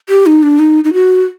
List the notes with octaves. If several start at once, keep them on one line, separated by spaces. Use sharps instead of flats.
G4
D#4
D4
D#4
D#4
F#4